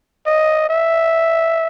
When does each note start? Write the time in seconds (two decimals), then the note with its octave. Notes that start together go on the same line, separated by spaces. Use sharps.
0.26 D#5
0.69 E5